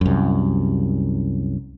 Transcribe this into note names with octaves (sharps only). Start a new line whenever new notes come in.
C2 F#2